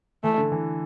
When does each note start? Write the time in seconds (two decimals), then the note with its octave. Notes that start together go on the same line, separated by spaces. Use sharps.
0.24 E3 A3
0.38 D3
0.52 E3